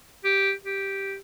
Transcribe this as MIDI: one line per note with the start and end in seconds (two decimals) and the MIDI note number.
0.24 0.52 67
0.65 1.17 67